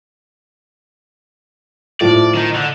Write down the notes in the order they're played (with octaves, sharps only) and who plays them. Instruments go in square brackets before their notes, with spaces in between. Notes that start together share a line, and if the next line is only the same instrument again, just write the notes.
[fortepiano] A2 F3 F4 [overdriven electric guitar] D5
[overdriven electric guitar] D#3 D#4
D3